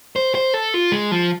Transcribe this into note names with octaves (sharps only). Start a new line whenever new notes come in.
C5
C5
A4
F4
G#3
F3